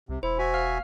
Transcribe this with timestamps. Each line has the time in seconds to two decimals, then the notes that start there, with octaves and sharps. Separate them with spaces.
0.09 C2 C3
0.23 E1 E4 C5
0.39 F#4 E5 G#5
0.54 F5 F6